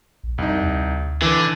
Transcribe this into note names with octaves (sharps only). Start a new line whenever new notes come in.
A#1
C2 F2 D#4
D2
D3 E3